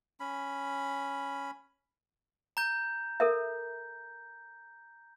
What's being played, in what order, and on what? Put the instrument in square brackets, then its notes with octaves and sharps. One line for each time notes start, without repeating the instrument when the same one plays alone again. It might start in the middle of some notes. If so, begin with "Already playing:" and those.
[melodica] C#4 B5
[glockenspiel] A#5 G6
[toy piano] A4 A#4 E5